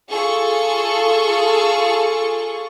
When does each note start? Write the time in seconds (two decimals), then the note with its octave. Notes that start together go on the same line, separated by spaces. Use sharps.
0.10 F4 G#4 A4 C#6